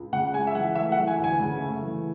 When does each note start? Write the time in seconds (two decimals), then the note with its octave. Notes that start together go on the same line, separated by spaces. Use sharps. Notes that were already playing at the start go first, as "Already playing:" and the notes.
Already playing: C#2
0.12 C#3 F#5
0.33 G#3 G#5
0.47 E5
0.54 E3 F#5
0.75 A3 E5
0.92 F#5
0.96 E3
1.07 G#5
1.18 D2
1.24 G#5
1.39 C#3
1.61 A3
1.82 E3